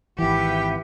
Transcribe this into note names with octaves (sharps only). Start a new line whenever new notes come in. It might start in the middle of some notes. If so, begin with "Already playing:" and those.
G#1 E3 G4 B4 E5 F#5 G5